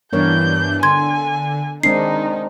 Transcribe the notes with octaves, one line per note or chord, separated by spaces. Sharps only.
G2 E3 B3 D4 A#4 C#5 G6
D3 G#5 C6 G#6
D#3 G#3 C4 D4 D#4 C7